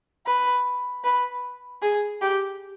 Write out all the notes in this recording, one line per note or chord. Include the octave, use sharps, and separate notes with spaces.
B4
B4
G#4
G4